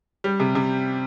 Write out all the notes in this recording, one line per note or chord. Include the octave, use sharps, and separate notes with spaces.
G3
C3
C3